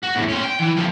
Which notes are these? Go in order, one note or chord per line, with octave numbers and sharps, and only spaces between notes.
F#4
E2 A2
C#4 C5
G5
E3
A2 F3